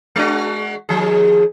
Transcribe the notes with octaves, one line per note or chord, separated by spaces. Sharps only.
G#3 D4 F#4
D#2 F3 G#4